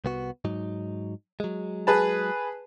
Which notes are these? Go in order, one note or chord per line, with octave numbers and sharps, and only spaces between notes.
C2 B3 F#4
G#2 F#3 D#4
F#3 G#3
G#4 B4 A5